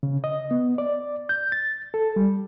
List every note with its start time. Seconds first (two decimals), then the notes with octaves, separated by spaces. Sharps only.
0.03 C#3
0.24 D#5
0.51 B3
0.78 D5
1.29 G6
1.52 A6
1.94 A4
2.16 G3